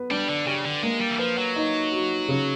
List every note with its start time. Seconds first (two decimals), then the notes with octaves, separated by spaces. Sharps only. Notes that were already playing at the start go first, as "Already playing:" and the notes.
Already playing: B3 B4
0.11 G3 D4
0.28 D3
0.46 C#3 G4
0.65 D3
0.83 G#3 A#3
1.01 G3
1.11 E3
1.19 F3 B4
1.38 F#3
1.56 D#4
1.92 F#4
2.28 C#3